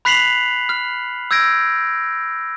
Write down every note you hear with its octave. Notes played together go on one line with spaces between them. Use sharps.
B5 F#6 B6 C7 F7 F#7
F6
E6 G6 G#6 A#6 D7